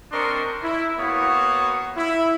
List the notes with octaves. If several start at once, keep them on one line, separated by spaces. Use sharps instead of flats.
C4 D4 A#4 D#5 C6 C#6
E4
A#3 B3 F#4 C#5 F5 D#6
E4